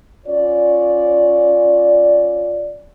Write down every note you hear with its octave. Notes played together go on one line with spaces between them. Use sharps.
C#4 F4 C#5 D5